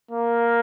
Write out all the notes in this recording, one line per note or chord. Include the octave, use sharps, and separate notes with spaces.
A#3